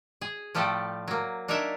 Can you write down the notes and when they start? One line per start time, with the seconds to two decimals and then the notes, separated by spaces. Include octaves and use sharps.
0.21 G#4
0.55 A2 F3 G3 A3 G4 A4
1.08 F#3 A#3
1.48 D4 D#4 A#4 C#5 E5